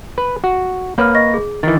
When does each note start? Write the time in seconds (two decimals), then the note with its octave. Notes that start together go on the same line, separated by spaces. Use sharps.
0.18 B4
0.44 F#4
0.98 A#3 B4 C#5 F6
1.15 D#5 C#6 A#6
1.34 G#4
1.63 D#3 E3 A6